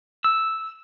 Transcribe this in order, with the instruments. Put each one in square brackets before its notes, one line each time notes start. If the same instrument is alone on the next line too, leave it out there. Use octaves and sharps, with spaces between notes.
[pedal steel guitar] E6